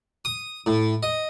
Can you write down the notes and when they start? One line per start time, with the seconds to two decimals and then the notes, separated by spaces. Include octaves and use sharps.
0.25 D#6
0.66 A2
1.03 D#5